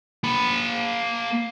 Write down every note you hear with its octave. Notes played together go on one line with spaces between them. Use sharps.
A#3 B5